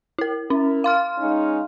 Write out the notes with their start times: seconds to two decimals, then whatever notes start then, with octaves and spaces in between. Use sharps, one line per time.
0.18 E4 A#4
0.50 C#4 E4 A#4
0.84 F5 C6 F6
1.18 G#3 C#4 D#4